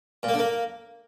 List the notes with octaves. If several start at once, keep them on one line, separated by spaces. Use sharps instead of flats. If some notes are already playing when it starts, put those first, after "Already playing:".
A#2
A#3
D3
A#3